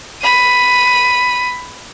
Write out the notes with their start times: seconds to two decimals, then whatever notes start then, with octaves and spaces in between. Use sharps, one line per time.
0.22 B5 D#7